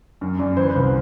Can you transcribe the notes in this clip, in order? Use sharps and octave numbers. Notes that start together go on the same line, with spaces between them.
F#2
F#2 D5
E3 C5
B4
C2
C5